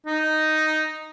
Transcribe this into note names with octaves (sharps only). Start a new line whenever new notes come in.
D#4